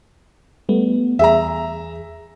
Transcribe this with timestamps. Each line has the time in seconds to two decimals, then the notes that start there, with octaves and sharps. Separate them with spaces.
0.69 G3 A3 B3
1.19 E2 G#4 E5 A#5